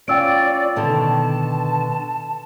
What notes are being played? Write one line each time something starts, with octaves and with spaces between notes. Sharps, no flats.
C#4 F4 D5 G5 E6 D7
B2 D3 D#3 A5